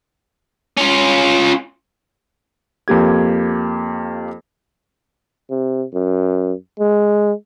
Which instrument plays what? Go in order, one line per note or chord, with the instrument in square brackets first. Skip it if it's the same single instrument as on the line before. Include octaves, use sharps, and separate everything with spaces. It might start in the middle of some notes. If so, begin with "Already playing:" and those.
[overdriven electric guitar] C#4 F4
[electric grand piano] F2 A#3 G4 G#6
[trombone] C3
F#2
G#3